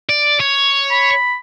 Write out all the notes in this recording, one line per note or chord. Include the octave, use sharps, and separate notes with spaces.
D5
C#5
B5